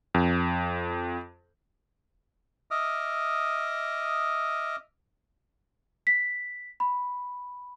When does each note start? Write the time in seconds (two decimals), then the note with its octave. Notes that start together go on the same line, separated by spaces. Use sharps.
0.14 F2
2.71 D#5 E5 D6 D#6 F6
6.07 B6
6.80 B5